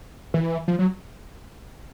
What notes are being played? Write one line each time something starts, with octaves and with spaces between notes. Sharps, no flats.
E3
F3
F#3